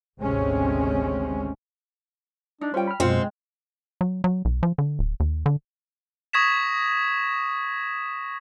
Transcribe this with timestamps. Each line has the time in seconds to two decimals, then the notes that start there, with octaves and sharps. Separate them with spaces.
0.21 G#1 D2 C3 G#3 C4 C#4
2.61 D4 D#4
2.74 G3 C#4 F4 C5 G5
2.87 B5 F6
3.00 F#2 B2 G#3 C4 F4 F#5
4.01 F#3
4.24 F#3
4.45 B1
4.63 F3
4.78 D3
4.99 D1
5.20 D#2
5.46 D3
6.33 C#6 D#6 G#6 A#6 B6 E7